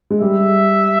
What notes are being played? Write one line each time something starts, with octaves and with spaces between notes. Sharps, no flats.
G#3
G3 E5